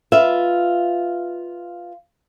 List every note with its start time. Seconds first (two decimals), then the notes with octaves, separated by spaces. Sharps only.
0.12 F4 B4 D#5 E5